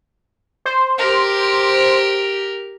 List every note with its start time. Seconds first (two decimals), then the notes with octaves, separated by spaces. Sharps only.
0.66 C5
0.98 G4 A#4